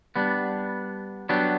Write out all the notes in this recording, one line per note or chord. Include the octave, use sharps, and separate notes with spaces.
G3 B3 D4
F#3 B3 D4 G4